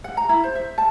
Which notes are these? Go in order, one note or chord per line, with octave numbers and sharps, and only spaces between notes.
F#5
A#5
E4
C5
E5
A5